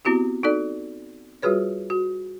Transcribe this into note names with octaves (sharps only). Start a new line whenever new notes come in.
B3 C4 E4 F#4 G4
D#4 F#4 A4 D5
G3 F4 F#4 G#4 B4 C#5
F#4